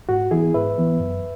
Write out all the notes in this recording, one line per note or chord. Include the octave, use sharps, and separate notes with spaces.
G#2 F#4
E3 B3 E4 G#4
G#2 B4 E5
E3 B3
F#2